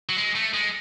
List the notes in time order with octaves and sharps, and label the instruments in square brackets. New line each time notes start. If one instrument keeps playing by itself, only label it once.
[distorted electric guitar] F#3
G#3
A3
G#3